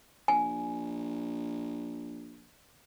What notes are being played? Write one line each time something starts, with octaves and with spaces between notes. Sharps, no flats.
A#1 G#5